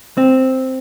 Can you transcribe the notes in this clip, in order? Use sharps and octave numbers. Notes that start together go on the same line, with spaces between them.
C4